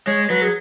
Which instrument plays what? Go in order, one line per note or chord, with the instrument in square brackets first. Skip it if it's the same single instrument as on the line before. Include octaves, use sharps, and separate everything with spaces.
[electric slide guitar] G#3 [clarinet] C#5
[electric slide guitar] F#3 [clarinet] B4
[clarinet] G#4